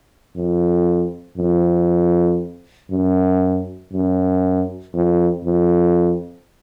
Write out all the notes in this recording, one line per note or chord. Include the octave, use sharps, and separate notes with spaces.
F2
F2
F#2
F#2
F2
F2